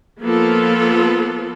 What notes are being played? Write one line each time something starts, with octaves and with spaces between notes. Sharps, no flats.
F3 A#3 B3 F4 A4